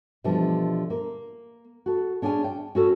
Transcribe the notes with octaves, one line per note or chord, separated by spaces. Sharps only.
B2 D3 E3 F3 G3 A4
A#3
F#4 A4
C#4 D4 G#4 F#5 G#5
G5
C#4 F#4 A4